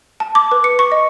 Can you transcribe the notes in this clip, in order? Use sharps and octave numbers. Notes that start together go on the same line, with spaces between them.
A5
D6
B4
C#7
C#6
D#5